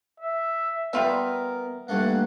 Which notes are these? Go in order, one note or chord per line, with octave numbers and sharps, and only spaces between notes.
E5
G3 B3 F4 A#4 E5
G2 A3 A#3 F#5